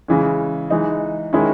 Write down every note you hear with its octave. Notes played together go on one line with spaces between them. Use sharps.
C#3 E3 G#3 C#4
E3 G#3 D#4
D#3 G#3 C#4 E4